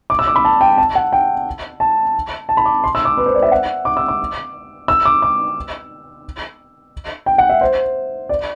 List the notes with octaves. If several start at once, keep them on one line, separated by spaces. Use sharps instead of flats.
D6
E6
D6
B5
A5
G5
A5
F#5
G5
A5
A5
B5
D6
C6
E6
D6
B4
C5
D5
E5
F#5
D6
E6
D6
E6
D6
D6
G5
F#5
E5
C5
D5